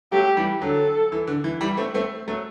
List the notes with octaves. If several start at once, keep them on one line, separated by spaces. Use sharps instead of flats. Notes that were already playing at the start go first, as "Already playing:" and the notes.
F#3 A3 G4
E3 G3
D3 F#3 A4
E3
D3
E3
E3 G3
A3 C4
A3 C4
F#3 A3